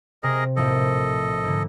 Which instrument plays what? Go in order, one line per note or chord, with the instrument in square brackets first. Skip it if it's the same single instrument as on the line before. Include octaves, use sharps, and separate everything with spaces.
[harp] C3 [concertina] G#4 A#4 D#5
[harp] A#1 A2 F3 [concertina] A4 D#5
[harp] G#2 D3